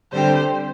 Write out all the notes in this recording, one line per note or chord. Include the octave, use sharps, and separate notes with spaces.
D3 G3 C4 G4 C5